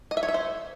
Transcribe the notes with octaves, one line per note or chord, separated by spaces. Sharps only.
D#5
E5
C#5
E5
C5